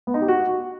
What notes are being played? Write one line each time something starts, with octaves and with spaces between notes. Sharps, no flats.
B3
D#4
G4
F#4